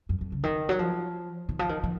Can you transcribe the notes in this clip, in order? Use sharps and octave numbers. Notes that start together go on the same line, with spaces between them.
F#2
F2
C#3
D#3
F#3
F3
D#3
F3
D#3
F3